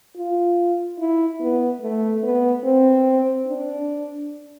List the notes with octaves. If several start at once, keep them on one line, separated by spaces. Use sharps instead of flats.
F4
E4
B3
A3
B3
C4
D4